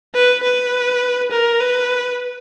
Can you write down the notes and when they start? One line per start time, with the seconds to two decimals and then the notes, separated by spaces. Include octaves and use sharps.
0.14 B4
0.43 B4
1.32 A#4
1.61 B4